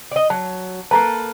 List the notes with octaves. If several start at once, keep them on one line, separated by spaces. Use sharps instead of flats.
D5 D#5
F#3 A5
A#3 A4 B4 A5 A#5